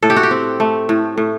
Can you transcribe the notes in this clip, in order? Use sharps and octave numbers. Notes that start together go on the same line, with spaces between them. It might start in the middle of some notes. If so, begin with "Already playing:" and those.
A2 A4
G4
F#4
G4
C4
A3
A2
A2